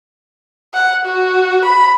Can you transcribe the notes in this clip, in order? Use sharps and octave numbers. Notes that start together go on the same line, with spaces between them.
F#5
F#4
B5